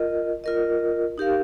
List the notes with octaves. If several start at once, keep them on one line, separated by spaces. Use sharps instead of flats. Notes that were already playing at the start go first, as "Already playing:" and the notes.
Already playing: F4 A#4 D#5
F4 A#4 D#5
D#4 G4 A#4 F5